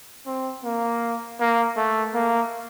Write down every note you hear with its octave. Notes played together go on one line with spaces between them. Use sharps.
C4
A#3
A#3
A3
A#3